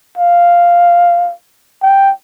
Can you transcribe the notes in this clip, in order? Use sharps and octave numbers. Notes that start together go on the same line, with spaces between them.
F5
G5